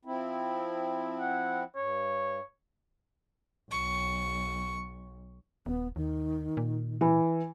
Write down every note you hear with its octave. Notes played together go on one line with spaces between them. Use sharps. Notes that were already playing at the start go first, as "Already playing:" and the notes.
F3 C4 E4
F#5
G2 C#5
B1 C#6
D#1 B3
D#2 D#3
A#2
E3